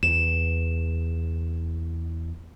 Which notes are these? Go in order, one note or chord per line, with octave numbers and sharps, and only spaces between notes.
E2 E7